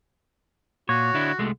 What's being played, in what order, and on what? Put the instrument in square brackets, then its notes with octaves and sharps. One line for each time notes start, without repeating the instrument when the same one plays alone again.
[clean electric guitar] A#2 [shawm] F#4 [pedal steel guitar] C#5
[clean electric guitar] D3 D4 E4
C2 G#3 A3